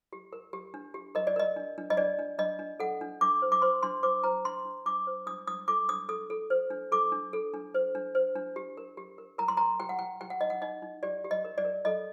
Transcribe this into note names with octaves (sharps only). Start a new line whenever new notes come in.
G4
A#4
G4
D4
G4
A#4 D#5
D5
A#4 D#5
D4
D4
D#5
D4 D5
D4
D4 D#5
D4
A4 F#5
D4
D4 D6
C5
D6
C5 C6
D4 C6
C5 D6
C5 A#5
D4 C6
D4
D4 D6
C5
D4 D#6
D4 D#6
A4 D6
D4 D#6
A4 D#6
A4
C5
D4
A4 D6
D4
A4
D4
C5
D4
C5
D4
G4
A#4
G4
A#4
A#4 A#5
C6
A#4 A#5
G4 G5
F#5
G4 G5
G4 G5
F#5
D#4 D#5
F#5
D#4 D#5
D#4
G4 D5
G4
D#5
A#4
D5
A#4
A4 D#5